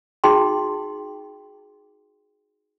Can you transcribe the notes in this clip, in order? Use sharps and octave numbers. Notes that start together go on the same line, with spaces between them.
D#4 F#4 G#4 G5 C6